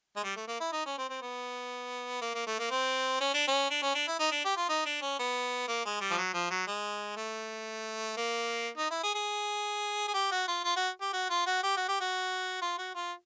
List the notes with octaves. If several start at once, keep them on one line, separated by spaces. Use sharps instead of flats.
G#3
G3
A3
A#3
E4
D#4
C#4
C4
C4
B3
A#3
A#3
A3
A#3
C4
C#4
D4
C#4
D4
C#4
D4
E4
D#4
D4
G4
F4
D#4
D4
C#4
B3
A#3
G#3
G3
F3
F#3
F3
F#3
G#3
A3
A#3
D#4
E4
G#4
G#4
G#4
G4
F#4
F4
F4
F#4
G4
F#4
F4
F#4
G4
F#4
G4
F#4
F4
F#4
F4